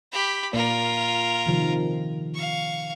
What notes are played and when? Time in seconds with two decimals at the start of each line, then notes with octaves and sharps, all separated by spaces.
0.12 G4 B5
0.53 A#2 A#3 F4 A#4 D5
1.46 C3 D#3 F3
2.34 F5 C#6